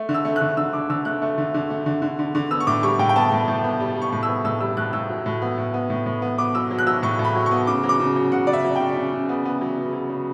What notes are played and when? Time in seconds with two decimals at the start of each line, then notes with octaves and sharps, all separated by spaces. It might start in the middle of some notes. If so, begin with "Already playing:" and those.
Already playing: A3
0.09 D3
0.14 E6
0.25 A3
0.36 F#6
0.41 D3
0.57 D3 E6
0.73 D3 D6
0.90 D3 E6
1.05 A3 F#6
1.22 A3
1.38 D3
1.54 D3
1.70 A3
1.86 D3
2.02 D3
2.19 D3
2.35 D3
2.51 B3 E6
2.60 C#6
2.67 A2 D6
2.83 G3 C#6
2.99 A2 G5
3.09 G5
3.16 B3 A5
3.32 A2
3.48 A2
3.64 B3
3.80 G3
3.96 G3
4.02 C#6
4.12 A2
4.23 E6
4.28 B3
4.45 A2 E6
4.61 G3 E6
4.77 A2 F#6
4.93 A2 E6
5.09 F#3
5.26 A2
5.42 B3
5.58 A2
5.74 B3
5.90 A2
6.06 A2
6.22 B3
6.38 B3 D6
6.55 F#3 E6
6.71 F#3
6.79 F#6
6.87 F#3 E6
7.03 A2 C#6
7.19 A2
7.24 B5
7.35 F#3
7.46 C#6
7.51 B3
7.67 C#3 D6
7.84 F#3
7.89 D6
8.00 C#3
8.16 F#3
8.32 C#3 F#5
8.47 C#3 D5
8.53 E5
8.64 F#3
8.76 C#3 G5
8.97 C#3
9.13 C#3
9.29 B3
9.45 B3
9.61 F#3
9.77 C#3
9.93 F#3
10.09 C#3